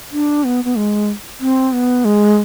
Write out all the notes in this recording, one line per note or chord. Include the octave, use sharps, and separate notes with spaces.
D4
B3
B3
G#3
C4
B3
G#3